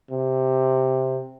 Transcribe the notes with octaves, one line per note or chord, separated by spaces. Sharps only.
C3